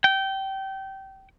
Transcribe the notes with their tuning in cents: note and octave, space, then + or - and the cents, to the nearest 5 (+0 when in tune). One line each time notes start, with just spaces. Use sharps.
G5 -20